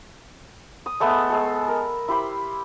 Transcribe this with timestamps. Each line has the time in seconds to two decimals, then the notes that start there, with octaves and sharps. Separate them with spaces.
0.86 D#6
1.00 G#3 A3 B3 E5
1.30 G#3 A4
1.68 A#4
2.08 E4 G4 C5 B5